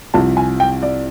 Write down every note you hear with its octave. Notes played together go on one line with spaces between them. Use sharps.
C2 C3 F3 A5
G#5
G5
D5